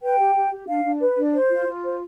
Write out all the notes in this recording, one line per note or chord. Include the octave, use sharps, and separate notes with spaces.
B4 G5
G4
G4
G4
D4 F5
D4
B4
D4
C5
F4
F4
C5